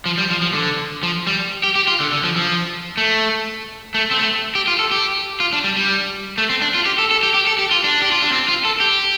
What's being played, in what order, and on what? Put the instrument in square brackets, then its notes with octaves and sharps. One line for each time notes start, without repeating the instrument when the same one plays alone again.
[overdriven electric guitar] F3
G3
F3
F3
D3
F3
G3
G4
G4
F4
D3
D3
F3
F3
A3
A3
C4
A3
G4
F4
A4
G4
F4
D4
G3
G3
A3
C4
D4
F4
G4
A4
A4
G4
G4
A4
G4
F4
D4
G4
F4
D4
C4
F4
A4
G4